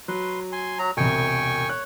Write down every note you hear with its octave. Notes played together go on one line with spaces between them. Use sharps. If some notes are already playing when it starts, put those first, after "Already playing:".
F#3 B4 C6
G#5 C6
F#3 A#5
E1 C2 G5 G#5 C#6
C#5 F#6